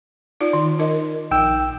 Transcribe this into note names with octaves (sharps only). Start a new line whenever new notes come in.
D#4 F4 D5
D#3
D#4 A#4 D#5
A#1 F3 D#4 G5 E6